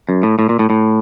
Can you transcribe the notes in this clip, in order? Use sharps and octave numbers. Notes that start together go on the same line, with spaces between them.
F#2
A2
A2
A#2
A2
A2